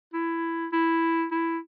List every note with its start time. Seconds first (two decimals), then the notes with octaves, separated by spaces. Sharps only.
0.13 E4
0.72 E4
1.31 E4